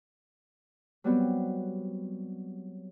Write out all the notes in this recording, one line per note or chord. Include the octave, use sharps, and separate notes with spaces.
F#3 G3 B3 C4